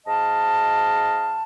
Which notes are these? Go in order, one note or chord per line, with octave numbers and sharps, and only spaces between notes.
G#2 D#5 F5 A5